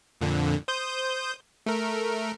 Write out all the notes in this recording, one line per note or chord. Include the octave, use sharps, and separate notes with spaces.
F2 A#2 D3
C5 D#6 G6
A3 A#4